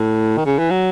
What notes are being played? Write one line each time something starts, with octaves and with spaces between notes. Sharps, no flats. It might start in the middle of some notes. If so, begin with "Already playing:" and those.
Already playing: A2
D#3
C#3
E3
F#3